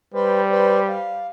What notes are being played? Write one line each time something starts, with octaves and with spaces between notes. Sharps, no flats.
G3 B4 C5
B4 C5 D5
F5